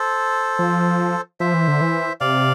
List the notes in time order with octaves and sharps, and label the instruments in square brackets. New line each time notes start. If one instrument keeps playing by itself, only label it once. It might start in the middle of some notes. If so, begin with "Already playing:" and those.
Already playing: [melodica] A4 C5
[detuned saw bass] F3
[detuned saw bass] F3 [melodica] C5 E5
[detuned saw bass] E3
D3
E3
[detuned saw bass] C3 [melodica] D5 F5